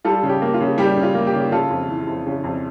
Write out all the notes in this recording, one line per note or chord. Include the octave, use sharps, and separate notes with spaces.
G3 F4 A4
C#3
G4
A#3
F4
C#3
G3 G4
C#3
F4
A#3
G4
C#3
C#3 F4 A4
F2
E3
F2
C#3
F2